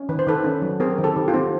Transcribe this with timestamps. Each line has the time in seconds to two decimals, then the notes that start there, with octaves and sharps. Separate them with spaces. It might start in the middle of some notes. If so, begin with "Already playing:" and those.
Already playing: C#4
0.09 D#3 B4
0.19 C5
0.27 D#3 A4 B4
0.44 C#4
0.62 F#3
0.80 C4 G#4 A#4
0.98 D#3
1.04 G4 A4
1.16 D#3
1.28 F4 G4
1.34 C4